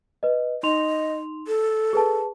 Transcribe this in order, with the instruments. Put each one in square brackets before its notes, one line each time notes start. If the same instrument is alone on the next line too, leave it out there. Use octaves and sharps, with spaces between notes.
[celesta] B4 D#5
[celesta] D#4 C6 F7 [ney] D#5
[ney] A4
[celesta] G#4 B4 A5